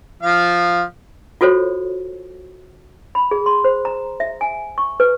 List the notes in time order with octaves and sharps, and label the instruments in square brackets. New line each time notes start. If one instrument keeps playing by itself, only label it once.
[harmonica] F3 F5
[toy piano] F4 F#4 A4 C5 C#5
B5
G#4
C6
C5
A#5
E5
G#5
C#6
B4